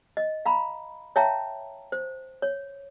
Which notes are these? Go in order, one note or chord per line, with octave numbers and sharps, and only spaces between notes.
D#5
F5 A#5 B5
C#5 E5 F5 G5 A5 A#5
C5
C#5